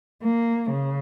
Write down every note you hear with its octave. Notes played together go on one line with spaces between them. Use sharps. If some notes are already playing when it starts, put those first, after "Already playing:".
A#3
C#3